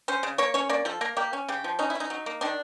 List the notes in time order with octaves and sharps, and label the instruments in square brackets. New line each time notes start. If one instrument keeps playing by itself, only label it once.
[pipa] C#4 C5
C#3
A#3 C#5
C#4 C#5
A#3 D5
F3 A4
A#3 A#4
A#3 G4
C#4
C#3 G4
F3
C#4 D#4
E4
C#4 D#4
F#3
A#3
D#3 D4